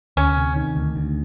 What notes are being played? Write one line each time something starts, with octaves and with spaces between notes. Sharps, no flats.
D2 C#4
C3
D#3
D2
D2